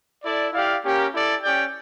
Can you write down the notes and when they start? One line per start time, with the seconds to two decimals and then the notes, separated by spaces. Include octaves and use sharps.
0.23 E4 A4 D5
0.53 E4 G4 D5 F5
0.83 A#3 C#4 G4 A#4
1.12 E4 A4 D5
1.42 C#4 G4 D5 G5